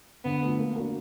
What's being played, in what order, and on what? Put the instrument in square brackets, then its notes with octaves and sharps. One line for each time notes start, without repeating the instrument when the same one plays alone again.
[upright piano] D3 [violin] B3
[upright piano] F3 A3
A#3
D4 F#4 A#4